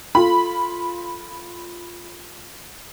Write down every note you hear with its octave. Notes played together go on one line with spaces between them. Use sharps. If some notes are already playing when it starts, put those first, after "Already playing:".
F4 A4 B5